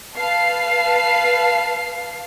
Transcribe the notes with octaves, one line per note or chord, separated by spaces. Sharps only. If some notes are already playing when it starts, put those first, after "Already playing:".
B4 F5 A5 C7